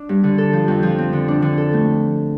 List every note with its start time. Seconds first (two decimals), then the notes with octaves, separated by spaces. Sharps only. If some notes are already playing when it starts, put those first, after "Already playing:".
Already playing: D4
0.09 G2
0.24 D3
0.38 A4
0.53 F3
0.68 F2
0.83 F3
0.99 C4
1.13 D3
1.28 D4
1.42 D3
1.58 A4
1.73 A3